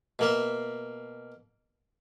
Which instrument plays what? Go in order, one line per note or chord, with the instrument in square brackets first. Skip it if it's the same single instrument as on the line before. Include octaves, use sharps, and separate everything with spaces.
[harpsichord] B2 A#3 E5